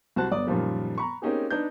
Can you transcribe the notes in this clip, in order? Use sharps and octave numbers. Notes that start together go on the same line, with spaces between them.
C2 F#4 C5 A5 F#6
G1 B3 D5 D#6
F#2 A#2 D#3 F3 G3
A#5 B5 C#6
A#3 C4 C#4 D#4 G4 G#4
D4 D#4 B4 G6